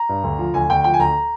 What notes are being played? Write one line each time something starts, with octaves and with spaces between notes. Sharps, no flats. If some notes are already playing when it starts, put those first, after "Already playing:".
Already playing: A#5
G2
D2
F3
D2 G#5
D2 G5
F3 G5
G#5
D2 A#5